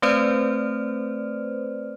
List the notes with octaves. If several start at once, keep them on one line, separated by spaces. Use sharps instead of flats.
A3 C4 B4 C5 D5 F6